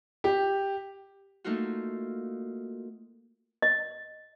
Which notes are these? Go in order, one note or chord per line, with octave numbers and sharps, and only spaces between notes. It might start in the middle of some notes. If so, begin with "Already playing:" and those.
G4
A3 A#3 D#4 F4 F#4
D#5